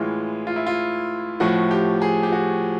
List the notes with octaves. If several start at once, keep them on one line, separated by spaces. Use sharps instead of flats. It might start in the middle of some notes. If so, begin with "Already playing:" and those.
Already playing: A2 E3 G#3 F4
F4
E4
F4
A2 F3 A3 F#4
G4
G#4
G4
F#4